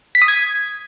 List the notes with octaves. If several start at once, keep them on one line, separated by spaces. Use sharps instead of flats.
B6
D#6
G#6